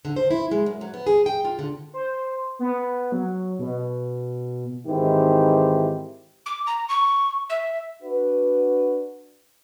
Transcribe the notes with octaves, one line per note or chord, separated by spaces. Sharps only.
D3
C5
E4
G#3
F#2
F#3
B3
G#4
G5
F4
D3
C5
B3
F#3
B2
G#2 D#3 E3 C4 E4 G4
D6
A#5
C#6
E5
D4 F#4 B4